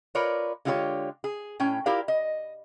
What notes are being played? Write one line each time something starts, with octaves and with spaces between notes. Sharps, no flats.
F4 A#4 B4 C#5 D5
D3 G#3 F4 G4 A4 C#5
G#4
A2 C#4 G5
E4 F4 G4 A#4 D5 F5
D#5